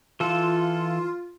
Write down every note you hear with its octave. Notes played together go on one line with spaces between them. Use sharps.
E3 F4 A4